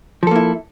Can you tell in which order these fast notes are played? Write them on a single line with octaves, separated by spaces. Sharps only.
F3 A4 A#3 E4